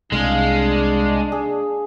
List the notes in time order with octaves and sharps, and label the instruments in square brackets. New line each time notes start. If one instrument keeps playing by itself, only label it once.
[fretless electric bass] C2 [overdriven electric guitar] G#3 [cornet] D4 [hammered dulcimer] G#4 F5
[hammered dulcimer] G#4